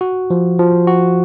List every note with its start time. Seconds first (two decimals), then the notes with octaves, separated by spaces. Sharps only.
0.01 F#4
0.30 F3
0.59 F3
0.87 F#4